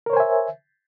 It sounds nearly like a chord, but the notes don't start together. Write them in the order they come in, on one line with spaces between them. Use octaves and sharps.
A#4 C#5 C5 G#5 E5